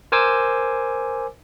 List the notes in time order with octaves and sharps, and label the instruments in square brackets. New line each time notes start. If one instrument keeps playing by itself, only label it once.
[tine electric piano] A#4 C5 G#5 D6 E6